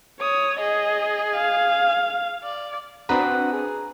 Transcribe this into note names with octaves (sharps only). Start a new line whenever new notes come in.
C#5 D#6
G#4 D#5
F5
D5
C4 D4 F#4 B4 A#5 D#6
G#4